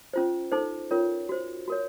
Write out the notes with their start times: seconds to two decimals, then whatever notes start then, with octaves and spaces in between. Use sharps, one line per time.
0.14 C#4 F4 C5
0.52 D#4 A4 C5
0.91 C#4 F4 A#4 C#5
1.29 F#4 C5
1.68 F#4 A#4 C#5